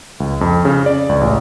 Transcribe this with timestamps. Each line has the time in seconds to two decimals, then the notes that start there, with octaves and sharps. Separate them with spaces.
0.20 C#2
0.41 F2
0.65 C#3
0.86 D5
1.09 C#2
1.21 A1